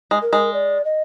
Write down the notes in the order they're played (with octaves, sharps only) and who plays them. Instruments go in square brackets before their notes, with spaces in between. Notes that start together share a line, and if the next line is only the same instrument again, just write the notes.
[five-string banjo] G#3
[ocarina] A#4
[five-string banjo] G#3
[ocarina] D5
D#5